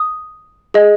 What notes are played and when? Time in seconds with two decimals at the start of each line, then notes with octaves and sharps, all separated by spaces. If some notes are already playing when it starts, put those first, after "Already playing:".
Already playing: D#6
0.74 G#4 D#5